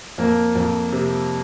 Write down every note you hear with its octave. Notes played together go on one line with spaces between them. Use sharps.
F2 A#3
F2
C3